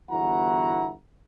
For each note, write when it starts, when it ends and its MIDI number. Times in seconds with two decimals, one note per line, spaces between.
0.10 0.91 31
0.10 0.91 40
0.10 0.91 64
0.10 0.91 66
0.10 0.91 78
0.10 0.91 82